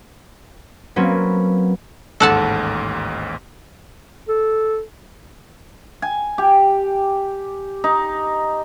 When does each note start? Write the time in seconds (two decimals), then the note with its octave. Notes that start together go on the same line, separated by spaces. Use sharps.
0.96 F#3 A#3 C4 C#4 F#4 B4
2.20 A1 D#2 G#2 A4 F#5 A5
4.28 A4
6.02 G#5
6.38 G4
7.84 D#4